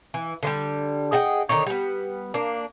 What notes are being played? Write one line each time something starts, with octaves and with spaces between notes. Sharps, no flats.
E3
D3 F3 G3
G#4 D#5 F#5 G5
D3 D#3 D#4 C#5
G3 B3
A#3 D4